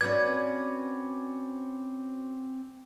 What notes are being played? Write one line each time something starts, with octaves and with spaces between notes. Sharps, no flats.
G#2 C#4 F#4 B4 D5 G#6
C4